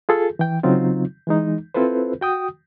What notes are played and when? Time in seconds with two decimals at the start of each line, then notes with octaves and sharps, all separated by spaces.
0.09 F4 G#4 A4
0.39 E3 G5
0.63 C#3 F#3 C4 D#4 F4
1.27 E3 G#3 D#4
1.74 C4 E4 F4 A4 B4 C5
2.21 F#4 G5 D#6